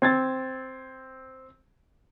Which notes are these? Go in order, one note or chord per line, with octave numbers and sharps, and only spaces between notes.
C4 G#6 A6